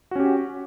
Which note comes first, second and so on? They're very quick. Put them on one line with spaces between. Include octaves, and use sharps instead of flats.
F#4 C#4 G4